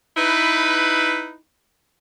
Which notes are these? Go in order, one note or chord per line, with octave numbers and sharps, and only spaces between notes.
D#4 E4 B4